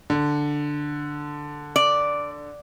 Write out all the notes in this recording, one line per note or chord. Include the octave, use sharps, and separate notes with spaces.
D3
D5